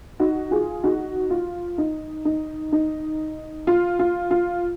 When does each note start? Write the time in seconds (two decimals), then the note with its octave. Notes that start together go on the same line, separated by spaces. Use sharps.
0.20 D#4 F#4
0.51 F4 G#4
0.84 D#4 F#4
1.30 F4
1.78 D#4
2.25 D#4
2.72 D#4
3.67 F4
3.99 F4
4.31 F4